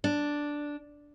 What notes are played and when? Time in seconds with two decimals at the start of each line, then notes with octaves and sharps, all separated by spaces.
0.04 D4